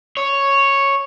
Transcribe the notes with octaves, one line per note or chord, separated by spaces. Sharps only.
C#5